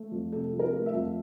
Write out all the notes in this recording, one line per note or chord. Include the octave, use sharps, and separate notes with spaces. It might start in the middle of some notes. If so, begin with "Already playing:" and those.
Already playing: A3
F2
C3 A4
F3
A#4
A3
E5
F2